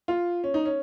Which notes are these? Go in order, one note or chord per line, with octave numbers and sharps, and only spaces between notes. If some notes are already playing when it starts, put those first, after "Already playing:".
F4
C#4
D#4
C#4